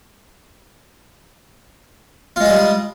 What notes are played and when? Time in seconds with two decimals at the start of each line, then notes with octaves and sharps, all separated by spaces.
2.36 F4
2.41 G#3
2.45 G#4
2.49 G3